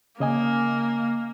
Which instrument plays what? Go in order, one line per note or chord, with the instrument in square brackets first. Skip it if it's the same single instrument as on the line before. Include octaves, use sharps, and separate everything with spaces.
[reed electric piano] C#3 D#5 G#5 [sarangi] A#3